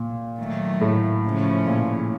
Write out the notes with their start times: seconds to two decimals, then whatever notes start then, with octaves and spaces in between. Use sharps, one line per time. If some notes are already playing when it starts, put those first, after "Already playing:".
Already playing: A#2
0.39 D#3 F#3 A3
0.81 A2
1.24 C#3 F3 A3 C#4
1.67 A#2